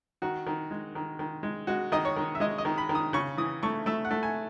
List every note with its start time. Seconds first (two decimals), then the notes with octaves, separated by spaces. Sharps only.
0.22 D#3 F#4
0.47 D#3
0.71 G#3
0.95 D#3
1.19 D#3
1.43 G#3
1.67 G#3 F#4
1.92 D#3 D#5
2.05 C#5
2.16 D#3
2.35 E5
2.40 G#3 D#5
2.58 D#5
2.65 D#3
2.78 B5
2.89 D#3
2.95 D#6
3.13 C#3 C#6
3.37 E3 D#6
3.63 A3 C#6
3.86 A3 E5
4.05 F#5
4.11 A3
4.23 G#5